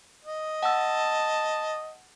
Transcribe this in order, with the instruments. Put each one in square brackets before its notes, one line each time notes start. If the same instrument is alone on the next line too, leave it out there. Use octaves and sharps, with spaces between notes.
[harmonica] D#5
[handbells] F#5 E6 [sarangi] A5